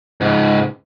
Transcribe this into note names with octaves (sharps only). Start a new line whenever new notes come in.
C#2 G#2